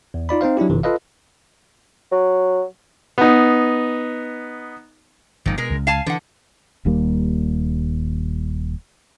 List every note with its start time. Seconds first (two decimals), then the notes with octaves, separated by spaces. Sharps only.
0.14 E2
0.29 D#4 F4 D5 B5
0.41 C4 D#4 C5 F5
0.57 F#3 D4 E4 G4
0.70 G1 C3 E3
0.83 F4 A4 B4 D#5 F5
2.12 F#3
3.18 B3 D#4
5.46 G1 A#2 D#3 F3
5.58 B2 G#3 A#4
5.70 C#2
5.87 F5 G#5 A5
6.06 D3 E3 F#5
6.85 D#1 D#2 G3 A#3